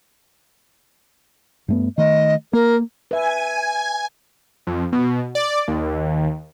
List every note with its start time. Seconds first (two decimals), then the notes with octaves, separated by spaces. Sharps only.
1.68 G2 A3 B3
1.98 D#3 A3 D#5
2.53 A#3 A#4
3.11 B4 E5 G#5
4.67 F2
4.92 B2
5.35 D5
5.68 D#2